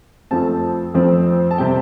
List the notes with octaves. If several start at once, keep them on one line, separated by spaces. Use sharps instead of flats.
F2 F3 A3 C4 A5
F2 F3 A3 C4
A5
C3 G3 C4 G5